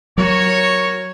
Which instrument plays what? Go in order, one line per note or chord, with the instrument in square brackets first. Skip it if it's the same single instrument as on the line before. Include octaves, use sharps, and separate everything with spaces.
[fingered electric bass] F#3 [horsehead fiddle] F#4 A#4 [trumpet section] C#5